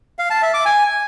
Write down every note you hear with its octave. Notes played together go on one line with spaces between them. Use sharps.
F5
A5
E5
D6
G#5